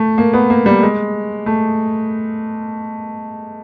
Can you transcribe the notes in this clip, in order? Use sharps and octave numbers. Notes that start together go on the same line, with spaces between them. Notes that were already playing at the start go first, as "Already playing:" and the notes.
Already playing: A3
A#3
B3
A#3
G3
G#3
A3